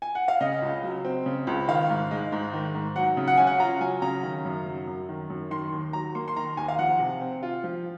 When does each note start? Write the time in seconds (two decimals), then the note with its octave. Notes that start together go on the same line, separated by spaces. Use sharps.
0.02 G#5
0.15 F#5
0.28 F5
0.40 C#3 D#5
0.62 C#2
0.83 F#3
1.04 C4
1.26 C#3
1.47 C#2
1.68 D#3 F5
1.90 G#2
2.11 G#3
2.32 G#2
2.53 D#3
2.75 G#2
2.96 F#3 F#5
3.17 C#3
3.28 F#5
3.37 C#4 G#5
3.47 F#5
3.60 F4 A#5
3.81 F#3 G#5
4.02 C#3 A#5
4.23 D#3
4.45 F#2
4.66 F#3
4.87 F#2
5.09 D#3
5.30 F#2
5.51 D#3 C6
5.72 D#2
5.93 F#3 A#5
6.15 A#3 C6
6.28 C6
6.36 D#3 A#5
6.57 D#2 G#5
6.68 F5
6.79 F3 F#5
7.00 C3
7.21 C4
7.43 F4
7.64 F3